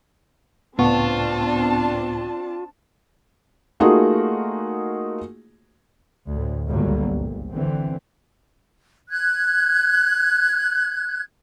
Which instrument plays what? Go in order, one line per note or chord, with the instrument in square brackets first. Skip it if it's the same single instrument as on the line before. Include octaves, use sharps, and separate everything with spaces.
[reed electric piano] C#2 A2 C#6 [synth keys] B3 [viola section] C4 D4 A5 [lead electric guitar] F4
[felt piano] A3 A#3 D#4 F4 F#4 G#4
[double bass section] D2 A2
G1 C#2 D3 F#3 G3 A#3
A#1
D3 E3 C4
[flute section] F#6 G#6